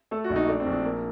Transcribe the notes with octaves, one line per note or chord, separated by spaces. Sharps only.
A3 A4
F#4
A#1
D#4
A3 D4
C4
A#1
D4
A#3